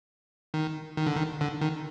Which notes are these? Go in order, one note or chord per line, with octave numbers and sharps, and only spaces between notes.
D#3
D#3
D3
D#3
D3
D#3